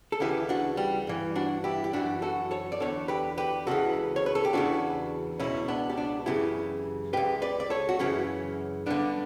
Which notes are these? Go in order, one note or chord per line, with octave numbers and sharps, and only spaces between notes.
A4
D2 C#3 E3 E4 G4
D4 F#4
G3
G2 E3
D4 F#4
E4 G4
G4
F#2 E3 D4 F#4
F#4 A4
A4 C#5
D5
E2 D3 A4 C#5
G4 B4
G4 B4
C#2 C#3 E3 F#4 A4
C#5
B4
A4
G4
E2 C#3 E3 D4 F#4
C#2 B2 C#4 E4
B3 D4
G4
D4 F#4
F#2 C#3 E3 E4 G4
C#2 B2 G4 B4
B4 D5
D5
A4 C#5
F#4
F#2 C#3 E3 C#4 E4
G2 D3 B3 D4